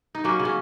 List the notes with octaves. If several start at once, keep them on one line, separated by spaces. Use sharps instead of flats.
D#4
F#3 A#3 C#4
C#3
C#4